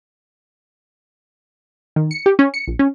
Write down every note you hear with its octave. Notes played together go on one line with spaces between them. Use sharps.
D#3
C#7
G4
C#4
C#7
A#1
C#4